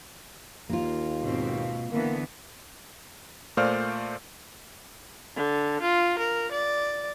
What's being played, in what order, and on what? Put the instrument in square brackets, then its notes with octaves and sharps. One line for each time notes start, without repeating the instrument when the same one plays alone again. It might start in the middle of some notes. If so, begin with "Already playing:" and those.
[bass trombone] D#2 [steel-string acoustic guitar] A#3 F4
[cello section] G#2 B2 C4
[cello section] D3 E3 B3 [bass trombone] A#3
[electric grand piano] A#2 A3 C5 D5 F5 F6
[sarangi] D3
F4
A#4
D5